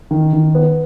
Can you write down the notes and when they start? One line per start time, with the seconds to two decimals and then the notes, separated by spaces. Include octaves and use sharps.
0.11 D#3
0.33 D#3
0.55 B3